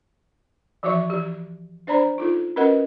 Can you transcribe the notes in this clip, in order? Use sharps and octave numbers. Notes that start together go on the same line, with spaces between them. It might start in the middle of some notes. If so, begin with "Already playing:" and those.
E3 F3 F#4 C#5 E5 C#6
E3 G4
D4 C5 D5 A#5 B5
D#4 F4 A4
C#4 F#4 A#4 B4 D#5 F#5